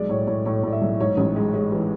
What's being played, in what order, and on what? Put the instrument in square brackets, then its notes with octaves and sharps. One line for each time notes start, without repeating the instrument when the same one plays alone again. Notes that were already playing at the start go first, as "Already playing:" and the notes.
Already playing: [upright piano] B1 G#3 D5
A2 C#5
A2 C#5
A2 C#5
A2 D5
E5
B1
G#2 C#5
A1
G#3
G#3
E3